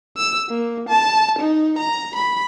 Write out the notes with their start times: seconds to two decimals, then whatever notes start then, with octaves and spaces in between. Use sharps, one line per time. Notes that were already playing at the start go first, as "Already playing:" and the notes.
0.17 E6
0.49 A#3
0.89 A5
1.39 D#4
1.79 A#5
2.16 B5